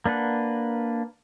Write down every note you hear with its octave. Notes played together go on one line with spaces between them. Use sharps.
A#3 D4 B4 F#5